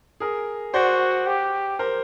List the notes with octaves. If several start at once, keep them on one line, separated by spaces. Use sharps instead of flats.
G#4 A#4
F#4 C5 D5
G4
A#4 C5